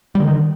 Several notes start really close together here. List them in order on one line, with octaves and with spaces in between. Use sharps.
G3 D3 D#3